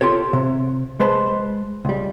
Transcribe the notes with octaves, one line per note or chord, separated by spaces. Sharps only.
F4 G4 A4 C#5
C3
G#3 B4 C5 A5 B5
C#2 G3